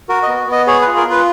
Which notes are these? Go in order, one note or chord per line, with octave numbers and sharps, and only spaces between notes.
F#4 A#4
D#5
B3
B3 D#5
G#4 C#5
F4 B4
A#4
F4 B4